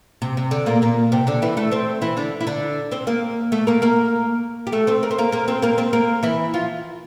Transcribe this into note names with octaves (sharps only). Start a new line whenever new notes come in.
C3
C3
D3
A#2 A#3
A#2 A#3
C3 C4
D3 D4
E3 E4
A3 A4
C4 C5
E3 E4
D3 D4
E4
D3 D4
C4 C5
A#3 A#4
A3 A4
A#3 A#4
A#3 A#4
G4
A3 A4
C4 C5
A#4
C5
A#3 A#4
A#3 A#4
C4 C5
A#3 A#4
C4 C5
A#3 A#4
E3 E4
F3 F4